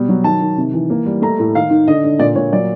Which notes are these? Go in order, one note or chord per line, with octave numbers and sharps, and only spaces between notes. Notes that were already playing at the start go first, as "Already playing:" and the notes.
Already playing: B2 G3
F#3
D#3 A5
D#3
C3
E3
A#3
G3
A3 A#5
A2
D#3 F5
D#3
D3 D#5
D3
A#2 D5
A#2 C#5
F#3 D5